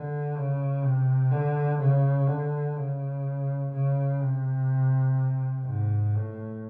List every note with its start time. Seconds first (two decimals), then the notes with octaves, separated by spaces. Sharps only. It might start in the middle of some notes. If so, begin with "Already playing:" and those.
Already playing: D3
0.35 C#3
0.83 C3
1.31 D3
1.79 C#3
2.27 D3
2.75 C#3
3.72 C#3
4.20 C3
5.65 G#2
6.14 A2